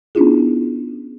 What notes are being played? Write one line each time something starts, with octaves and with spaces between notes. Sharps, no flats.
B3 C#4 D4 E4 F4 G#4